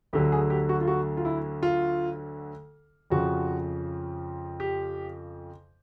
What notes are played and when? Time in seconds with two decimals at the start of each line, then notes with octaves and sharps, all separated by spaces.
0.13 D2 D3 F#3 G4
0.32 G#4
0.50 G4
0.69 F#4
0.81 F4
0.87 F#4
1.17 F4
1.25 E4
1.63 F4
3.10 F2 C#3 F3 F#4
4.60 G4